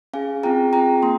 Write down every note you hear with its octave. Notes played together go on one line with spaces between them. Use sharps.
C#4 G#4 F5 G#5
C4 F4 G#4 G5 A#5
C4 F4 G#4 G5 A#5
A#3 C6